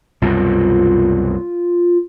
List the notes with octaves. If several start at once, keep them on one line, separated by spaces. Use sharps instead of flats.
C2 F#2 B2 F4